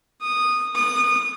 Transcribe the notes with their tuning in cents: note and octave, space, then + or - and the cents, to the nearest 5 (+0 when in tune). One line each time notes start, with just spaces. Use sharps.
D#6 -15
D#6 -25